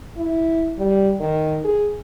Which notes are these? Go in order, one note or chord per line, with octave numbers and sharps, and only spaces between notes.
E4
G3
D#3
G#4